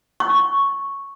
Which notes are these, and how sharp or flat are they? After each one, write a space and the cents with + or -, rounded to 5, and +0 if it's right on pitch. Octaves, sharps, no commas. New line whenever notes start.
C#6 +0